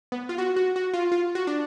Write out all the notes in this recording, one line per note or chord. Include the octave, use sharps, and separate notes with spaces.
B3
F4
F#4
F#4
F#4
F4
F4
F#4
D4